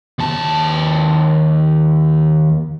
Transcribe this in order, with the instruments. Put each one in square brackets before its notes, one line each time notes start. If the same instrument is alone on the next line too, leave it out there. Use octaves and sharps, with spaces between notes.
[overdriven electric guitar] D#2 A5